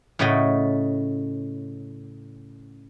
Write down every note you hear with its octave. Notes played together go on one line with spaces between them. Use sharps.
A2 C#3 A3 F#4 D#5 G5